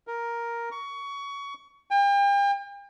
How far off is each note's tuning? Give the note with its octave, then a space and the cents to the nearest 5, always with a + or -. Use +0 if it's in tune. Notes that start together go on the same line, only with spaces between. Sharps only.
A#4 +5
C#6 +20
G5 +40